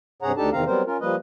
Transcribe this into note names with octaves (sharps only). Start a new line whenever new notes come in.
G2 C3 G#4 C#5 F#5 A#5
D2 D4 D#4 G4 A4 A5
E2 C3 D#3 C4 F5 A#5
F#3 G3 B3 C4 A#4 C5
C#4 F4 A#4
F3 G3 A#3 B4 D#5